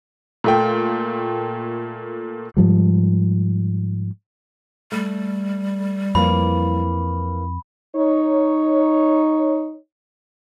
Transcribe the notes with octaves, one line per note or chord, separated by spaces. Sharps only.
A#2 A3 G5
G#2 F3 G3
G3 A3
F2 E3 A#3 B5
D#4 C#5